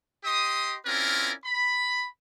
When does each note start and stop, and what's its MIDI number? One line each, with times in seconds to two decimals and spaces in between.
0.24 0.75 67
0.24 0.75 75
0.24 0.75 84
0.24 0.75 87
0.86 1.32 60
0.86 1.32 61
0.86 1.32 64
0.86 1.32 65
0.86 1.32 70
0.86 1.32 74
1.45 2.05 83